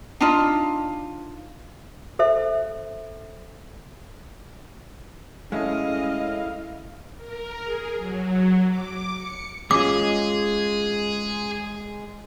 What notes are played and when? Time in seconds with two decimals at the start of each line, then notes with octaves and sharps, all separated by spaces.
0.20 D4 D#4 F4
2.19 A4 C5 E5
5.52 G#3 A3 C#4 E4 D#5 F5
7.17 A#4
7.64 G#4
7.97 F#3
8.68 D6
9.14 C#7
9.71 G#3 C#4 F4 G#4 D6